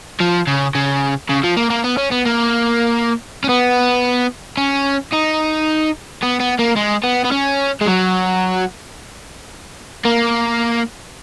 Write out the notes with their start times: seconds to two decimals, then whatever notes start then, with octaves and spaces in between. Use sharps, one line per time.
0.20 F3
0.47 C#3
0.75 C#3
1.30 C#3
1.44 F3
1.57 A#3
1.70 A#3
1.84 B3
1.97 C#4
2.11 B3
2.25 A#3
3.44 C#4
3.49 B3
4.57 C#4
5.12 D#4
6.23 B3
6.40 B3
6.59 A#3
6.76 G#3
7.03 B3
7.24 B3
7.32 C#4
7.81 G#3
7.86 F#3
10.05 A#3